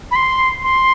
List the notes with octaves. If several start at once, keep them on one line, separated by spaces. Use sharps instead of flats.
B5
C6
C6